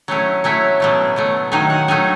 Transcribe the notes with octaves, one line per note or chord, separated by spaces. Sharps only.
F#3 A3 C#4 E4
F#3 A3 C#4 E4 E5
B2 F#3 A3
B2 F#3 A3
D#3 F#3 A3 D#4 G#5
F#5
D#3 F#3 A3 D#4 G#5